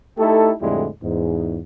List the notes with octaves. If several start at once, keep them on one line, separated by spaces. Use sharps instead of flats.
A3 D#4 E4 G4 A4
F2 A2 D3 G3 G#3 E4
E2 G#2